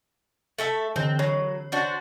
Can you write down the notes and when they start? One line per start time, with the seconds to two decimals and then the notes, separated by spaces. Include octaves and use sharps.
0.58 A3 A4 E5
0.96 D3 E3 C4
1.19 F#3 C#5
1.72 D4 F#4 C5